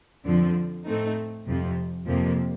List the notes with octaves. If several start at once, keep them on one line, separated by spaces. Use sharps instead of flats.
F2 D3 F3 C4
A2 A3 C4 D#4
F2 C3 F3
F2 C3 F3 A#3